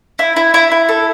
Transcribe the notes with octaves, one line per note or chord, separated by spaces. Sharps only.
E4
E4
E4
E4
A4